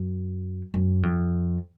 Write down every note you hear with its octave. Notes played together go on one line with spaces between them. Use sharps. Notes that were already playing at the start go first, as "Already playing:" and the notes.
Already playing: F#2
F#2
F2